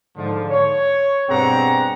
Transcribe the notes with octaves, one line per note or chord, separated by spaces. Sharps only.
G#2 D3 F3
C#5
G2 B2 C4 G#4 F#5 A#5